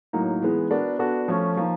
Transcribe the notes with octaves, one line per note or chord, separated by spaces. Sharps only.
A2 F#3 A#3 D#4
E3 G#3 B3
B3 D4 F#4 A#4
B3 D4 F#4 A4
F3 A3 C#4
F3 A#3 D#4